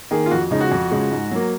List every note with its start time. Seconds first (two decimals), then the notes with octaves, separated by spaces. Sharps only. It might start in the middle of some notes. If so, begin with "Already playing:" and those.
0.11 D#3 A#3 G#4
0.26 F4
0.31 F2 F#4
0.51 C#3 F3 G#3 D#4
0.61 F#4
0.72 F2
0.91 C#3 F3 G#3
1.11 G#2
1.31 F#3 A#3